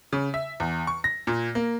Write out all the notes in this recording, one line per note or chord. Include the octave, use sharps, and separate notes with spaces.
C#3
E5
E2
C#6
A#6
A#2
A#3